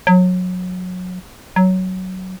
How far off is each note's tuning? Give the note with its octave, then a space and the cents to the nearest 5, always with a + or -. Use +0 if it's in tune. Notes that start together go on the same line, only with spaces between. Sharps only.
F#3 -25
F#3 +10